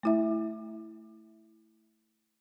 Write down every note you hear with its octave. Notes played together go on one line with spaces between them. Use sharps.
A3 E4 E5